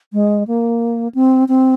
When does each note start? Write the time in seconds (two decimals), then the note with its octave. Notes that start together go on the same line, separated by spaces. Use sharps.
0.13 G#3
0.48 A#3
1.15 C4
1.48 C4